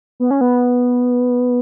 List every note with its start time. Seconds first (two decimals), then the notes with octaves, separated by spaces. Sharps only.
0.20 B3
0.31 C#4
0.41 B3